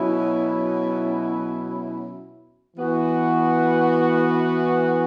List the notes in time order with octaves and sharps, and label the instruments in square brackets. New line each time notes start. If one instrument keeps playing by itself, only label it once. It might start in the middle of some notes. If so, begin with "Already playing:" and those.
Already playing: [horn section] B2 F#3 C#4 E4
E3 B3 F#4